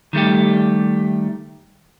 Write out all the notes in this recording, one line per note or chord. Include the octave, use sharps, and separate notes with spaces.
D#3 G3 A3 G4